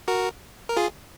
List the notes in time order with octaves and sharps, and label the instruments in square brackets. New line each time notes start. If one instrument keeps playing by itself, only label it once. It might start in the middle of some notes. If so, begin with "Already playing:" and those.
[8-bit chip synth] F#4 A#4
A#4
F4 G#4